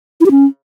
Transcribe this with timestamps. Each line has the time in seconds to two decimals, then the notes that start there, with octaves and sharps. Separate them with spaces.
0.21 E4
0.26 G4
0.31 C#4